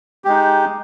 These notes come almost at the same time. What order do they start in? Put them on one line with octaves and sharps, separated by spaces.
G4 G#3 D#4